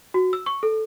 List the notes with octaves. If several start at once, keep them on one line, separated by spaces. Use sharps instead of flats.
F#4
E6
C#6
A4